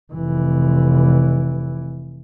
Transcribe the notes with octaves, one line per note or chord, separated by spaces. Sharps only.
F1 E3